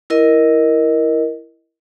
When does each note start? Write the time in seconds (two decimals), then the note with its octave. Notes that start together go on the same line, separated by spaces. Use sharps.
0.10 E4 A#4 D#5